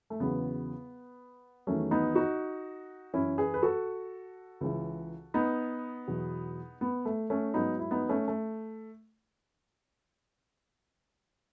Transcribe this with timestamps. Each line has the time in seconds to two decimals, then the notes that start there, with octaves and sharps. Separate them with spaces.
0.10 A3
0.20 E2 C#3 F#3 B3
1.67 E2 D#3 F#3 A3 C#4
1.91 B3 D#4
2.15 D#4 F#4
3.13 F#2 E3 C#4 E4
3.38 G#4 B4
3.54 B4
3.63 F#4 A4
4.61 C#2 C#3 E3
5.34 B3 D#4
6.07 E2 B2 F#3
6.81 B3
7.05 A3
7.30 A3 C#4
7.54 G#2 F#3 B3 D#4
7.79 E4
7.91 B3 D#4
8.09 A3 C#4
8.28 A3